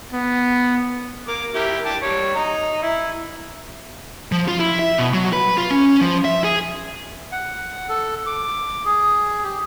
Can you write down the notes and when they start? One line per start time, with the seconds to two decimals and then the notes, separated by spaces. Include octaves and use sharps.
0.13 B3
1.28 A#4 D6
1.55 E4 G4 A#4
1.85 G5 A5 D6
2.02 G3 C#5
2.35 D#4 A#5
2.82 E4
4.32 F3
4.48 F4
4.60 E4
4.79 E5
4.98 B2
5.14 F#3
5.33 B4
5.58 F4
5.71 C#4
6.01 F3
6.25 E5
6.44 G#4
7.32 F#5
7.89 A4
8.26 D6
8.85 G#4
9.44 G4